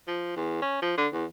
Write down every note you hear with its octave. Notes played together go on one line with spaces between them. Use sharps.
F3
E2
C#4
F3
D3
E2